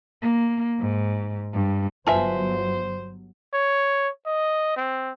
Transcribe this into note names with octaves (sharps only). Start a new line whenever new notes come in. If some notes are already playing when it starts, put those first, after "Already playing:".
A#3
G#2
G2
G1 F#3 F4 B4 C5 E5 G#5 A5
C#5
D#5
C4